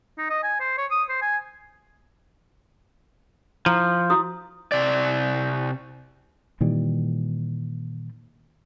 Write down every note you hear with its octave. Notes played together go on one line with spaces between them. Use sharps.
D#4
D#5
G#5
C5
C#5
D#6
C5
G#5
F3 E4
E4 F#4 D#6
C3 D5
A#2 D#3 E3 G3